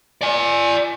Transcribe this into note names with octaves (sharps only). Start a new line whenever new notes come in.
D5 G#5